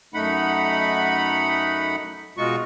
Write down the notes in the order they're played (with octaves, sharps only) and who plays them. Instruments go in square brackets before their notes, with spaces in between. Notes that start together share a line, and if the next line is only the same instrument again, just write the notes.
[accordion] F#2 A3 D#4 F#5 B5
B2 G#3 D#4 F4 F#4 C#6